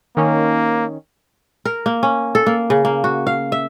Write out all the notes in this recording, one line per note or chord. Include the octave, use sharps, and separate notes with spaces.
D#3 A#3 C#4
A#4
A#3
C#4
A4
A#3
C#3
A#3
F#4
F5
E5